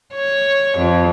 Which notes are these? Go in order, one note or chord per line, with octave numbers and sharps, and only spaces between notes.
C#5
F2